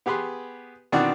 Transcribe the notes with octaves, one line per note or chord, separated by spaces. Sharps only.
B3 G4 G#4 B4 C6
B2 D#3 E3 C4 D4 F#4